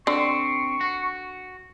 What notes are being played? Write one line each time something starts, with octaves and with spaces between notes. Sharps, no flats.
D3 C4 C#6
F#4